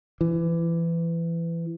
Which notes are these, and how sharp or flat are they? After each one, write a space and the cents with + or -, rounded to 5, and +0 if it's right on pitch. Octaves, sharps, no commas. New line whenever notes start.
E3 +25